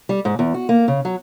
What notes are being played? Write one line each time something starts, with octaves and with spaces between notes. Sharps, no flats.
G3
G#2
E2
F#4
A#3
C#3
F#3